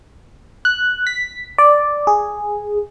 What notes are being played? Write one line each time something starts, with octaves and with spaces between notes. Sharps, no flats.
F#6
B6
D5
G#4